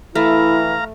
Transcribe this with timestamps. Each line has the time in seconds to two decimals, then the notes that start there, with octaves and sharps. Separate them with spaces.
0.15 E3 A3 E4 F5 A#5